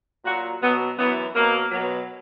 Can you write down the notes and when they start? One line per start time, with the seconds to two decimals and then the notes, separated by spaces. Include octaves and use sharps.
0.25 A#2 F#3 F#4
0.62 B2 F#3 B3
0.97 F#2 E3 B3
1.34 B2 F#3 A#3
1.71 B2 F#3